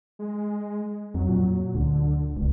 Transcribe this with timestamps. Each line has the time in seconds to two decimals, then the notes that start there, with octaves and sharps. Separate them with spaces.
0.19 G#3
1.15 F2 F#3
1.29 A#2
1.74 D2 D3
2.37 D1 C#2